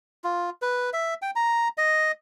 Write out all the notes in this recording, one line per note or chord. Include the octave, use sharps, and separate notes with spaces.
F4
B4
E5
G5
A#5
D#5